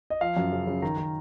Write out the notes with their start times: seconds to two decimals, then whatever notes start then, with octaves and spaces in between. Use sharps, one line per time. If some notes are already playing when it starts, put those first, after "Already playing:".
0.10 D#5
0.21 F3 F5
0.37 F#2
0.52 C#3
0.67 C#3
0.82 D#3 A#5
0.97 D#3